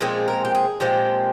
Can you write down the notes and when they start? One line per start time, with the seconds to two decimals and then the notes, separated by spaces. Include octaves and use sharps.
0.01 A#2 F3 G#3 C4 G#4
0.28 A#4
0.45 G4
0.55 G#4
0.80 A#2 F3 G#3 C4 G4